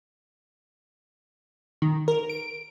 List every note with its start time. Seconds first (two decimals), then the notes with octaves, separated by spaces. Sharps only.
1.82 D#3
2.08 A#4
2.29 D7